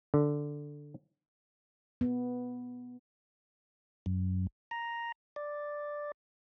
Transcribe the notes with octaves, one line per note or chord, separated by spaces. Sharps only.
D3
B3
F#2
A#5
D5